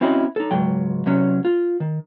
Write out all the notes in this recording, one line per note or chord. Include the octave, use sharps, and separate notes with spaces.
C4 C#4 E4 F#4 D5 D#5
D#4 A4
C#2 G#2 F#3 G5
C3 F#3 C#4
F4
D#3